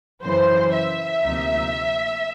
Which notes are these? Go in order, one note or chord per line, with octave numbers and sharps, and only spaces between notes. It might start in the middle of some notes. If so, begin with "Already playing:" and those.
F#2 C#3 E3 C5
E5
D2 C3 F3 A#3 D#4